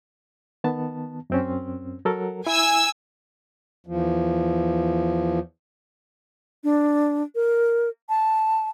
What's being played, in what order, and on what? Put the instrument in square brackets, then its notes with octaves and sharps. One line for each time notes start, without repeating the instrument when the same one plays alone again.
[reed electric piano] D#3 B3 A5
F#2 C4 C#4
F#3 A4 A#4
[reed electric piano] E4 [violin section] G#5 E6
[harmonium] E2 F3
[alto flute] D4
A#4
A5